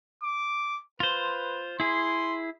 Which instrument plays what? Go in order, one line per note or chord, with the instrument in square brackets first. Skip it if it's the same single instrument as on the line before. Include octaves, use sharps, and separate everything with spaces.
[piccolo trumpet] D6
[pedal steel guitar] F4 C5 [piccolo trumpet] B4
[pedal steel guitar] E4 G#4 [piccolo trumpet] C6